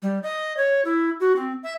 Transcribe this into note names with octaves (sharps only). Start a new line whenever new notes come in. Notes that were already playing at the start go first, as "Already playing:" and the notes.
G3
D#5
C#5
E4
F#4
C4
E5